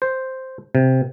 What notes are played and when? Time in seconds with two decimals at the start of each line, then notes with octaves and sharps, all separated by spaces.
0.02 C5
0.75 C3